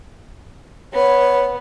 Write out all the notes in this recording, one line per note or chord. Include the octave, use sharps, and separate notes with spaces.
B3 C#5